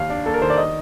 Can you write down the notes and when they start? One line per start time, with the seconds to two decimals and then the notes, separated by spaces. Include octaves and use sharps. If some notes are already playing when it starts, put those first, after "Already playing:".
Already playing: D#2 F5
0.10 D4
0.26 A#3 A4
0.34 A#4
0.42 D#3 C5
0.50 D5
0.57 D#5